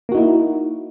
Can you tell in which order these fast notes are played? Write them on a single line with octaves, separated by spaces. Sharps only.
A#3 F#4 D#4 E4